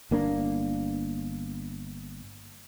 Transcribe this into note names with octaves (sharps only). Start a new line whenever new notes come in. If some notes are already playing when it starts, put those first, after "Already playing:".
G1 A#3 D4